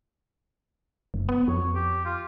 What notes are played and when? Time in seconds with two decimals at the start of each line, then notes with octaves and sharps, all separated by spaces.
1.14 F#1
1.29 B3
1.48 F2 C#5
1.75 G4
2.05 F4